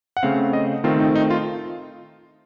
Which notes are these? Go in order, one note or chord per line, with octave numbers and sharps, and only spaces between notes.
F#5
C#3 A3 C4 F5
D#5
D#3 A3 C4 F4
D#4
D#4
F4